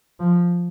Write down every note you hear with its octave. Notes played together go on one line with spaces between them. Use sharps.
F3